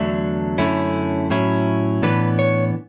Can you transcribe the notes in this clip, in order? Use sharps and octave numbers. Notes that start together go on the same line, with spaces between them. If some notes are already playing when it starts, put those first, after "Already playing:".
Already playing: E2 D3 F#3 A3 D4 E5
F#2 D3 A3 C#4 E4
A2 F#3 C#4 E4
A2 E3 B3 D4 B4
C#5